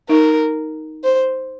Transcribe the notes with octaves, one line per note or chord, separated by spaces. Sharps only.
D#4 A#4
C5